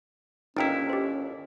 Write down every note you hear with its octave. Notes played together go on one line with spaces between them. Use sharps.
G1 D#2 C#4 D#4 E4 G5 A#5
G4 C5